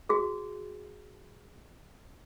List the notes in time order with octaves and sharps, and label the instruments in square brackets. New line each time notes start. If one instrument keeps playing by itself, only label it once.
[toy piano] F#4 G#4